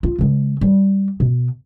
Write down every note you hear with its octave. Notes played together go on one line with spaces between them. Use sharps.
F4
C#3 G#3
G3
B2